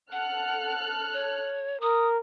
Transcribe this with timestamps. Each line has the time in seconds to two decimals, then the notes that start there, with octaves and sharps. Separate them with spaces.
0.12 A4 F#5 F6 F#6
1.14 C#5
1.81 A#4 D#6